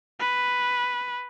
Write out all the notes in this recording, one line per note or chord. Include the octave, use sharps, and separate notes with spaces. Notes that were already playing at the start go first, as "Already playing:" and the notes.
B4